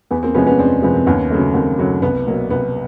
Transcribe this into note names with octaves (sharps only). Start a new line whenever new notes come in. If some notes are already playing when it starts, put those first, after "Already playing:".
E2 B3
A#3 C4
C3 F3 G#3 B3 C#4
B3 C#4
E2 C4 D4
C3 F3 G#3 B3
C4
D#2 B3 C#4
C#3 F#3 A3
D#2 A#3 C4
C#3 F#3 A3
C2 B3
B2 F#3 A#3
C2 B3